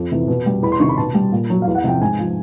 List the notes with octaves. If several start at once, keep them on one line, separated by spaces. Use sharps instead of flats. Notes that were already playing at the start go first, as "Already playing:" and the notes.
Already playing: F2
C3 E3
B2
G3
E2 B5
C6
C3 D#3 C#6
B5
B2 A5
G3
A#2
F#3
E2 F5
F#5
C3 F3 G5
G#2 G#5
F3